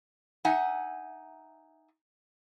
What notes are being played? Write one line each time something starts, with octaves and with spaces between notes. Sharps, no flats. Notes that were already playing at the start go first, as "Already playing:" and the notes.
D#4 E5 F#5 G#5